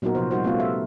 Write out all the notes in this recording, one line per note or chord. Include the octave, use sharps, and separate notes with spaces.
A#2 F#3 B3 D#4 F#4 A#4
C3 F3 C5
G3 D#4 F#4 C5
A3 B3 C#4 F4
E5